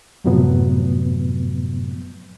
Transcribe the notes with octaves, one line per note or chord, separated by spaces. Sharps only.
F#2 A2 C3 F3 F#3 B3